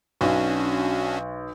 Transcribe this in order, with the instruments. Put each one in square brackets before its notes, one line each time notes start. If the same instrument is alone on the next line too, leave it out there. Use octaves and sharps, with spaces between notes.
[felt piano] B1 [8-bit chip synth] C#4 D4 F#4